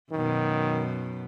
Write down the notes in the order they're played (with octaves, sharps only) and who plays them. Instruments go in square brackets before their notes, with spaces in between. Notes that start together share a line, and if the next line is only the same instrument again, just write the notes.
[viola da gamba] F#2 B2 [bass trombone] D#3